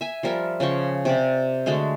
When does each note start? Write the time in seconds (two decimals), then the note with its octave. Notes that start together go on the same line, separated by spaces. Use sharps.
0.01 E5 G#5
0.23 F3 G3 A#4 E5
0.60 C#3 F3 G5 C#6
1.05 C3 G4 D5
1.66 D3 G#3 A3 F#4